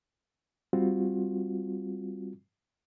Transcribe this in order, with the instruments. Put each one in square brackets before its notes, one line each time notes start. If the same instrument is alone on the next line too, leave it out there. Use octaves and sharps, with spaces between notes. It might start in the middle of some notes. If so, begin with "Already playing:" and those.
[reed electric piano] G3 C4 F4 F#4